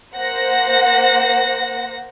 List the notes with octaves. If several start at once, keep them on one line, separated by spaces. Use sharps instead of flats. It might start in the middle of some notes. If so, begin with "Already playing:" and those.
A#3 C5 F#5 A#6